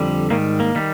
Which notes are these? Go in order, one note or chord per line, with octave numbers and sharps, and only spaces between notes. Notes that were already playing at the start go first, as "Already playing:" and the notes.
Already playing: F2 D3 G3
G#2 D#3 G3 A#3
A#3
D#3 G3